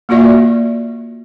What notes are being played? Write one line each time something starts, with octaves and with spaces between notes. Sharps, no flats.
A#3 F4 F#4 D5 E5